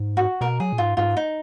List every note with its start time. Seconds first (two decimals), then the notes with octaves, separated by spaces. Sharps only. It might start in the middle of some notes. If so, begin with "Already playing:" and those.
Already playing: G#2
0.17 F#4
0.41 B2 A#4
0.60 F#3 G#4
0.73 A#2
0.78 G#2 F4
0.97 G#2 F4
1.17 D#4